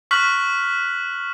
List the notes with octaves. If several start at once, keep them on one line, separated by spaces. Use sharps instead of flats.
C#6 F6 F#6 B6 F#7